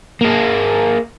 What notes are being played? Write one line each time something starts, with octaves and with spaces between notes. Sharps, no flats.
A#3 G#4